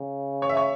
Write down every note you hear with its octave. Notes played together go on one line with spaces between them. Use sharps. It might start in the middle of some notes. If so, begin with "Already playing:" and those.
Already playing: C#3
C#5
E5
C#5